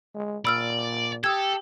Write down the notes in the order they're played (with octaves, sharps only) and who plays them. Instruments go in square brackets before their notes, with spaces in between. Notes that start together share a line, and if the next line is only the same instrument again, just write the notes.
[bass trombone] G#3
[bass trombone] A#2 [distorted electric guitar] D5 [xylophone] B5 E6 F6
[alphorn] G4 [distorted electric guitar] A4 [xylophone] D#6 E6 G#6